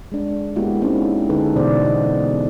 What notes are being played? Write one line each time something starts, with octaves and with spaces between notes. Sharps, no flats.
G#3 D4
G#3 A#3 B3 E4 F#4 G4
G#3 C4 C#4 D#4 F#4
D3 D#4 G#4 A4 B4
B2 D3 E3 B3 C5 D5
F#4 D5 D#5